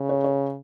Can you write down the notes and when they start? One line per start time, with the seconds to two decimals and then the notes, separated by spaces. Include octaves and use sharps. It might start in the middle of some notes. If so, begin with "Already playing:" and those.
Already playing: C#3
0.09 C#5
0.24 C#5